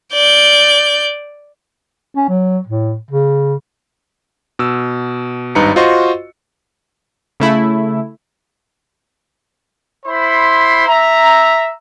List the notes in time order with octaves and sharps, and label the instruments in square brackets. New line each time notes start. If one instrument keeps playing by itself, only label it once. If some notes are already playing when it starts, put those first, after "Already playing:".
[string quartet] D5 G6
[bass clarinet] C#4
F#3
A2
C#3
[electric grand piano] B2 E6
G#1 G2 D#4 B4 A#5 C#7
F4 F#4 C5 D#5 C6 C#6
[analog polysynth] C#3 A3 E4
[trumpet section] E4 C5 B5 C6
E5 A#5